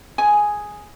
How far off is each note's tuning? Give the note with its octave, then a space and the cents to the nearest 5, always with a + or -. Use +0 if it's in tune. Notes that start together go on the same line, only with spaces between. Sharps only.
G#4 +0 G#5 +0